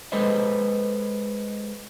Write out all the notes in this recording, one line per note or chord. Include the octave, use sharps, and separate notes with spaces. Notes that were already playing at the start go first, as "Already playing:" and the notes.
G#3 A4 B4 C5 D#5